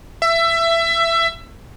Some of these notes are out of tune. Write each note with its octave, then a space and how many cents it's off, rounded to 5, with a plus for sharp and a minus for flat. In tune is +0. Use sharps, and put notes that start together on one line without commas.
E5 +20